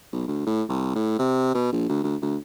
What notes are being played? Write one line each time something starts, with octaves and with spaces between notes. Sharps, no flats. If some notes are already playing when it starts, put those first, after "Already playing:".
B1
D2
A2
C2
A2
C3
B2
A#1
D2
D2
D2